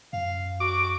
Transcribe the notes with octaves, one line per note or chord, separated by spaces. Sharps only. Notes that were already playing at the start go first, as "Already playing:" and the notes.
F#2 F5
F#4 D6